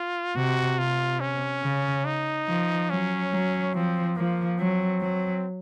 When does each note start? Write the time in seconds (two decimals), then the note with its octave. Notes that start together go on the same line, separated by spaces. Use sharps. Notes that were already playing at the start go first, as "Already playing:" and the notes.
Already playing: F4
0.35 C3 F#4
0.78 C3 F4
1.20 C#4
1.63 C#3
2.05 D#4
2.47 F3
2.89 F#3 C#4
3.32 F#3
3.74 F3 C4
4.17 F3 A#3
4.58 F#3 C4
5.01 F#3